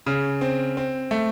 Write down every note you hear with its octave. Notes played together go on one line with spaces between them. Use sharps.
C#3
C4
C4
A3